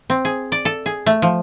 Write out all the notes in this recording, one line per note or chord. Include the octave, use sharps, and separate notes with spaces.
C4
G#4
D5
A4
G#4
A3
F3